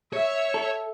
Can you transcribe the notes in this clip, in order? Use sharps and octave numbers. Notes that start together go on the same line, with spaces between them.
C#5 E5
A4